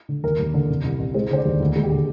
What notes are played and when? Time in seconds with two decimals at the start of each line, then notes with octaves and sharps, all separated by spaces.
0.09 D3
0.23 D#2 A#4
0.39 D#2
0.54 D3
0.69 C2
0.84 C2
1.00 C2
1.14 G#3 C5
1.30 D3 C5
1.38 D5
1.45 D#2
1.60 D2
1.76 G#3
1.83 G4
1.91 D3